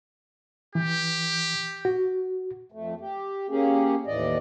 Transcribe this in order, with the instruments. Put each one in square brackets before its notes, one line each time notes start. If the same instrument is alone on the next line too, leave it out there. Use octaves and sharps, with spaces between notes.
[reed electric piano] E3 [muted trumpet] G4
[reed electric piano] F#4
[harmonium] F2 A3
G4
A#3 C#4 G4 G#4
D#2 A2 E3 D5 D#5